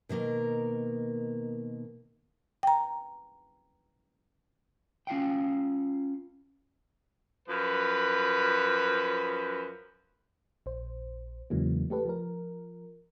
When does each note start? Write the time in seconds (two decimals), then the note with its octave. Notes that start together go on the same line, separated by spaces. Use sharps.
0.09 B2 D#3 A#3 A#4
2.63 G5 A#5
5.07 C#4 F4 F5 G5
7.49 F#2 F3 B4
10.66 A#1 C5
11.50 E2 C#3 E3 F#3 G#3 A#3
11.90 A3 G4 A4 B4
12.05 F3 A#4